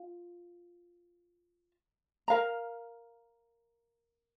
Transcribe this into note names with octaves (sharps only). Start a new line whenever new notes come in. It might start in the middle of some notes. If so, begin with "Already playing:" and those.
Already playing: F4
A#4 F5 A#5